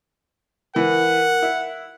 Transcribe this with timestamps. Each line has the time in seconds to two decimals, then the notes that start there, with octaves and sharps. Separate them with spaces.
0.76 E3 A#4 F#5
1.43 E4